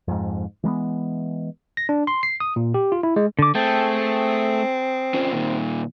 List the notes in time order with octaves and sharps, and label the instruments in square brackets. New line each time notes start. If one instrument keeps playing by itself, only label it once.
[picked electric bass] F2 G#2
E3 G#3 A#3 B3
[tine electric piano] A#6
D4
C6
C7
D#6
A#2
G4
F4
E4
G#3
[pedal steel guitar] D3 D6
[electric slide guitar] A3 [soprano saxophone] C4 [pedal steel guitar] G#4 G5 A5
[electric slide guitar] C#4 F4 C5
A#2 D#3